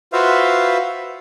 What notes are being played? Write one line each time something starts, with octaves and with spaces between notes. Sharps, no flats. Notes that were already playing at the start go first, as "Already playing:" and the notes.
F4 F#4 B4 C5 E5 F5